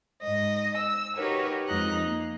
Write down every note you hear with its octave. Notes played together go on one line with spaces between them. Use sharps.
G#2 D#5
E6
D#4 F#4 G4 A#4 B4 C#5
F2 G#3 D#4 D#5 A#5 F#6
A#3